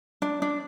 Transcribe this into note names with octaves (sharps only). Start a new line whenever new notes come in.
D4
D4